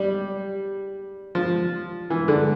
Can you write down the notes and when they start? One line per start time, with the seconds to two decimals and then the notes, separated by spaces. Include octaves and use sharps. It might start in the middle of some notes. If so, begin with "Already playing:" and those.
Already playing: G3
1.35 F3
2.10 E3
2.28 D3